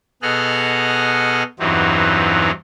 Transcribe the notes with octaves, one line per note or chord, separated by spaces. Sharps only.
B2 G#4 A4 D#5 F#5 F6
E2 G2 E3 F#3 C4 D#4